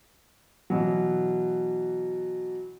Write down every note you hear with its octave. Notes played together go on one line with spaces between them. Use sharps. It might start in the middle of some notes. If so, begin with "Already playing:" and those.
B2 E3 F#3